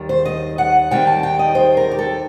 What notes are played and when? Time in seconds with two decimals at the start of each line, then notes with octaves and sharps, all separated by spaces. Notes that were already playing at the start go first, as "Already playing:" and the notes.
Already playing: D#2 D#3 G3
0.09 C5
0.25 D#5
0.58 F#5
0.91 D#2 D#3 G3 C4 G5
1.07 A5
1.23 G5
1.39 D#5
1.55 C5
1.77 A#4
1.91 G4
1.99 A4